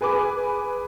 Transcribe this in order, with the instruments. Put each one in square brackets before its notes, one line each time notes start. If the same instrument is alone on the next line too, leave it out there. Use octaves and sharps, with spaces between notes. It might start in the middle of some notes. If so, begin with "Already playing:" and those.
[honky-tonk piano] G#4 B4 G#5 B5 D6